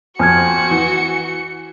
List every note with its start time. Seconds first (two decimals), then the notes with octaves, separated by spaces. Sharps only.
0.19 F2 F#4 G#5 F6 G#6 C#7
0.71 E3